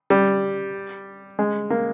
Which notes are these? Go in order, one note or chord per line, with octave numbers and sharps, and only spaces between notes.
G3
G#3
A#3